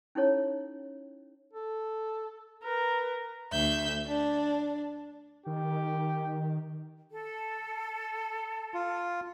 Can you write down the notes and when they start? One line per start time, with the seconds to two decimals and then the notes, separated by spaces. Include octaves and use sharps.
0.15 C#4 D#4 E4 A4 C#5
1.53 A4
2.64 A#4 B4
3.51 D2 E5 G6
4.06 D4
5.46 D#3 G4
7.12 A4
8.74 F4